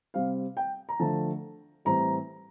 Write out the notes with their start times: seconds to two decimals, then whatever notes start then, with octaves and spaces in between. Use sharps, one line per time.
0.14 C3 G3 C4 F5
0.57 G5
0.89 A#5
1.00 D3 F3 A3 A5
1.85 A2 E3 G3 C4 A#5